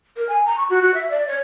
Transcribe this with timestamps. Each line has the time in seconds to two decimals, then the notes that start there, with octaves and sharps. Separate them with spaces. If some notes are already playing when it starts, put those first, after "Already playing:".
0.17 A#4
0.29 G#5
0.46 A#5
0.58 C#6
0.70 F#4
0.82 F#4
0.94 E5
1.11 D5
1.28 C#5